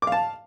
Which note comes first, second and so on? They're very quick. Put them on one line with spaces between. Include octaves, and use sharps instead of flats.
D6 F5 A5